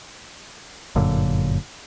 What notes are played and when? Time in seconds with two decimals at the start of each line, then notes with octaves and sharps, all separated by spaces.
0.95 G1 F#2 A#2 D3